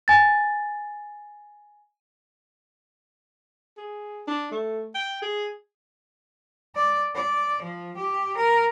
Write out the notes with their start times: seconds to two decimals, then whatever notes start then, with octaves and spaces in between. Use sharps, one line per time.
0.08 G#5 A6
3.78 G#4
4.28 D4
4.52 A3
4.95 G5
5.22 G#4
6.75 D5
7.15 D5
7.62 F3
7.96 G4
8.37 A#4